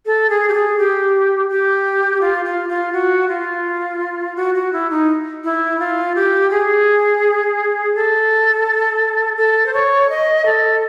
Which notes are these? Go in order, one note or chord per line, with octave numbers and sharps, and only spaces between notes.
A4
G#4
G4
G#4
G4
G4
F4
F4
F4
F#4
F4
F#4
F#4
E4
D#4
E4
F4
G4
G#4
A4
A4
C5
C#5
D#5
A4